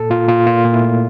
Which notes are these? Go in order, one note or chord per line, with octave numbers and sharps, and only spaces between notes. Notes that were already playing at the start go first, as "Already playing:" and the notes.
Already playing: A#2 A4
A#2 F4
A#2 F4
A#2 F4
A#2
E4
A3